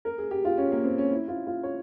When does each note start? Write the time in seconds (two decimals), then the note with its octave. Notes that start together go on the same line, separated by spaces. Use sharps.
0.05 A#4
0.18 G#4
0.31 G4
0.45 F4
0.58 C#4
0.72 A#3
0.84 C4
0.98 C#4
1.11 E4
1.28 F4
1.47 F4
1.63 C#5